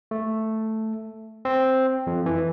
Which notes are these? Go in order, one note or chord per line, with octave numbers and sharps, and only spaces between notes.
A3
C4
F2
E3